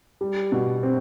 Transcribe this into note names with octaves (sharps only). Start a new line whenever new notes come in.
G3
B2
C4